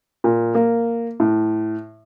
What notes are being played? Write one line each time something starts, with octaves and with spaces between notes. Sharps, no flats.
A#2
A#3
A2